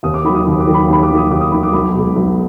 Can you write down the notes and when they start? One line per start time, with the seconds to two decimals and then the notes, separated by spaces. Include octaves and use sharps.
0.03 D#2 D#6
0.14 D6
0.25 D#3 B5
0.29 F#3
0.35 D#6
0.47 D#2
0.60 D6
0.67 D#3 F#3
0.74 B5
0.88 D#2 B5
1.03 D6
1.10 D#3 F#3
1.17 D#6
1.31 D#2 D6
1.41 D#6
1.51 D#3 F#3 B5
1.63 D6
1.73 B1 B5
1.94 B2 G#3
2.16 B1